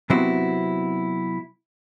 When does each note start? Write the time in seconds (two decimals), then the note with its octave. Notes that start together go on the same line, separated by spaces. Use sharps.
0.10 C3 F#3 B3 C4 E4 F#4